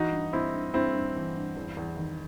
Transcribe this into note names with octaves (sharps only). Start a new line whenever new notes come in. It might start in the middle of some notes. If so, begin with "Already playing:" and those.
Already playing: E3 D#4 F#4
G2
G2 C4 E4
G2
G2 C4 E4
G2
E3
G2
E2
E2
D#3